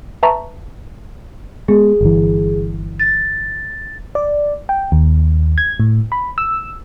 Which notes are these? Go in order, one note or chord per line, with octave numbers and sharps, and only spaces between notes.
B4 E5 A5 A#5 C#6
G#3 B3 G#4
G1 E3
A6
D5
G5
D#2
G#6
A2
B5
E6